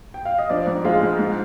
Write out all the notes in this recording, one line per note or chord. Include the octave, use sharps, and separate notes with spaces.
G5
F5
D#5
F3 D4 D5
G#2
G#3 F4 F5
G#2
G#2